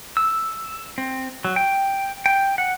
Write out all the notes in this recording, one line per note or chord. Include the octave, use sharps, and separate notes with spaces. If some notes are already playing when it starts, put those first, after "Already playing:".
E6
C4
F#3
G5
G5
F#5